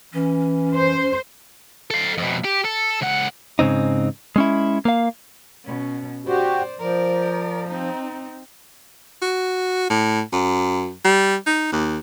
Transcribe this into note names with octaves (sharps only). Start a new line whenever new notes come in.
E3 C#4
C5
A4 F5
F2 B2
G4
A4
C#2 F#5
G#2 C#3 C4 D#4
G#3 C#4 E4
A#3 F5
B2 C#4
F#4 G4 C5 D5
F3 A#4 D5
C4 D#4
F#4
A2
F#2
G3
D#4
D#2